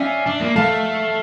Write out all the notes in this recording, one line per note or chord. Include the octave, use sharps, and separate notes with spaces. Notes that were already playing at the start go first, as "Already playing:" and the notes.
Already playing: C#4 D5 E5 F5 G5
D4
A#3
A3 F5 A5